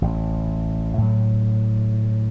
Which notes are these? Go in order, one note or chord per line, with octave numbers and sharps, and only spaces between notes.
A1
A2 F#3